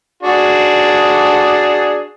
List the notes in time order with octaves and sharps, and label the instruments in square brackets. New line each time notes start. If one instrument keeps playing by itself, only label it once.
[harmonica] D4 F#4 G#4